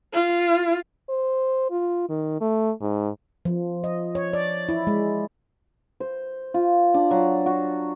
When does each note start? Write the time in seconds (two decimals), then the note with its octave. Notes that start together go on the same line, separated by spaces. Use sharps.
0.14 F4
1.09 C5
1.70 F4
2.09 D#3
2.41 A3
2.81 G#2
3.45 F3
3.84 D#5
4.15 C#5
4.33 D5
4.69 E4
4.87 G#3
6.00 C5
6.54 F4
6.94 D4
7.11 F#3
7.46 F#4